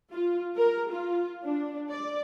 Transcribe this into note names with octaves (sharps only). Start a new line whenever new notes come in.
F4
A#4
F4
D4
D5